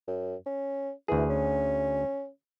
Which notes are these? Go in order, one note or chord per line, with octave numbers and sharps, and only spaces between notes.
F#2
C#4
D2 E3 G#4
C#4